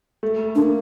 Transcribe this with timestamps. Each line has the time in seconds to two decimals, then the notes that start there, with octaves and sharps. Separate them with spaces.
0.23 A3
0.55 A#3 D4